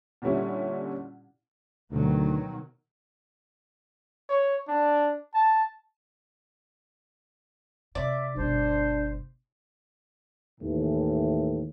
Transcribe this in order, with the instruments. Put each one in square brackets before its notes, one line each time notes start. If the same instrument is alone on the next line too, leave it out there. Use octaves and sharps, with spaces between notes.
[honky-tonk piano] A#2 D3 G3 C#4 E4
[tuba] D2 [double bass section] B2 D#3 F#3
[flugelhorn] C#5
D4
A5
[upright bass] C3 [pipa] D5 [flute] E5
[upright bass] G1 B2 [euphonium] D4 [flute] C5
[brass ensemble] D#2 A2 E3